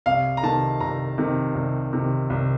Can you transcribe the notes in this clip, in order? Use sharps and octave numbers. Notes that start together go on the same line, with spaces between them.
C2 F5
A#5
C3 D#3 A5
C2 A#5
C3 D#3
C2
C3 D#3
C2